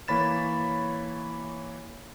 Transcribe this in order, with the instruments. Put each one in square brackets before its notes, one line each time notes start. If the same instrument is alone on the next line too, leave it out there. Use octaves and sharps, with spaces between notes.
[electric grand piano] E3 A#3 C#5 B5 A6 E7